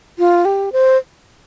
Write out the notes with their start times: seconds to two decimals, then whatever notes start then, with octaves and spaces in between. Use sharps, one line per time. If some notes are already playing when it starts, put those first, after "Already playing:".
0.19 F4
0.45 G4
0.73 C5